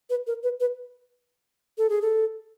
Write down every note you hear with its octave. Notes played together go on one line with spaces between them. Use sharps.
B4
A#4
B4
B4
A4
G#4
A4